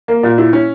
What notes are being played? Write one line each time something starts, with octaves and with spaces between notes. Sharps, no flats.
A#3
A#2
E4
C#4